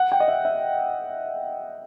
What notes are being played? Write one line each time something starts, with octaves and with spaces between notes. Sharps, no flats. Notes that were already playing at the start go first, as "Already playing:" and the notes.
Already playing: F#5
G5
D#5
E5
E5